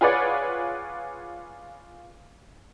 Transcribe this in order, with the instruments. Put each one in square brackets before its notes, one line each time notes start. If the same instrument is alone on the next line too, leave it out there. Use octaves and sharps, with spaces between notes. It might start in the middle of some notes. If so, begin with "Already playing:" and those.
[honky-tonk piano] F4 G#4 B4 C#5 D5 F#5